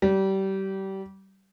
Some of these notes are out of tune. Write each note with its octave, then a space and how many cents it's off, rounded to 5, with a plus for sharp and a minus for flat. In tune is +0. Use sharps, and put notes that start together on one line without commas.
G3 -25